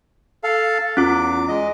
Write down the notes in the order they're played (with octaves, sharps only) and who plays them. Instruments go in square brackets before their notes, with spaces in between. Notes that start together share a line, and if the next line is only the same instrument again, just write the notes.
[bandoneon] A4 F5
[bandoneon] E2 D6 [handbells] C#4 F4
[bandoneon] G#3 D#5